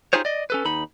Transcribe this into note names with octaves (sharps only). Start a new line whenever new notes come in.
D#4 F4 G4 G#4 C5 C#5
D5 D#5
C#4 A4 B4
D#2 D#4 B5